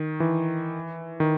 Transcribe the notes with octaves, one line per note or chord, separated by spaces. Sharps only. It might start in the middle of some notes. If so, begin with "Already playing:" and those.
Already playing: D#3
E3
D#3